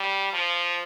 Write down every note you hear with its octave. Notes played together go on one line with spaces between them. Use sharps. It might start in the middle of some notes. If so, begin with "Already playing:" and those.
Already playing: G3
F3